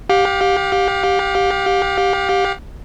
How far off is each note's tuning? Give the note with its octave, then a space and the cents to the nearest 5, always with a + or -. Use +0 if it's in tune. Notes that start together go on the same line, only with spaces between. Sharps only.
G4 +0 F5 +35